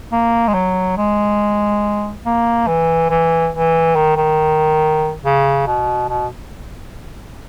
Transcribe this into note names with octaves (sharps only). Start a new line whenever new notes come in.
A#3
G#3
F#3
G#3
A#3
E3
E3
E3
D#3
D#3
C#3
B2
B2